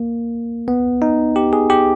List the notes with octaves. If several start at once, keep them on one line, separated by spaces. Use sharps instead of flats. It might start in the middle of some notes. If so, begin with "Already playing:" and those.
Already playing: A#3
B3
D#4
G4
G#4
G4